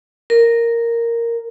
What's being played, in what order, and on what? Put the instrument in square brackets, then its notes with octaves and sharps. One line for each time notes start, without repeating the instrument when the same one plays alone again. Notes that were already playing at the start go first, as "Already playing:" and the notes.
[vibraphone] A#4